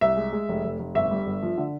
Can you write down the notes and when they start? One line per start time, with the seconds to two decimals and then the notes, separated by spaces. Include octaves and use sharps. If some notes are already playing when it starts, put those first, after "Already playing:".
0.01 C2 E5
0.17 G#3
0.33 G#3
0.49 F1
0.64 F1
0.79 F1
0.95 G1 E5
1.11 G3
1.26 G1
1.43 F3
1.58 D3